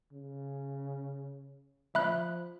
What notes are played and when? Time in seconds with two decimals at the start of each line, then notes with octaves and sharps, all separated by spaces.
0.12 C#3
1.95 F3 E5 B5 F#6